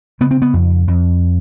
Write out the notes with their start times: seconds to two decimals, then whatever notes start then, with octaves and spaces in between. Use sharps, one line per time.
0.21 C#3 B3
0.31 C4
0.42 B3
0.53 F2
0.88 F2